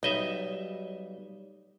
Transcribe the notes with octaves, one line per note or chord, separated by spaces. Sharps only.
B1 G3 D#4 D#5 E5